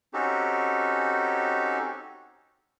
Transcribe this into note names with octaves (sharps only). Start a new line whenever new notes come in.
C4 C#4 D#4 F#4 G4 A4